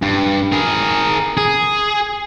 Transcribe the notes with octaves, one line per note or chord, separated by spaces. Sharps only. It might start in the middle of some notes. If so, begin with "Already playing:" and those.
G2
G#4 A#4
G#4